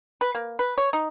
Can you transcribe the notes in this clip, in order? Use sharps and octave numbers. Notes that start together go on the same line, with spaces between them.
B4
A#3
B4
C#5
D#4